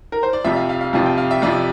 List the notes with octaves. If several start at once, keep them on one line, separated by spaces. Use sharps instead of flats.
A#4
C5
D5
F2 C3 F3 E5
F5
F5
F5
F2 C3 F3 F5
G5
F5
E5
F2 C3 F3 D5